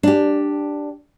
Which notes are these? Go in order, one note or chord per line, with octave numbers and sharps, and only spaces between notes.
D4 G4